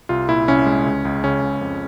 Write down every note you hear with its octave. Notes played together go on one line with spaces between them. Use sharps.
C2 F4
A#2 E4
C2 C#4
G#3
C#2
C#2
C#3 C#4
C#2
F2